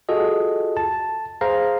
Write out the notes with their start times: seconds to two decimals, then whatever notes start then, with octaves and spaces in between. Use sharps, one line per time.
0.09 F4 F#4 G#4 A4 D#5
0.77 A5
1.41 G#4 C5 F5 A#5